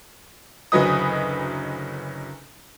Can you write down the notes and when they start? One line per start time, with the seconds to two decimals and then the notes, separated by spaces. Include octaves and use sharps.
0.72 F#1 D2 F#3 B4 D#5 D#6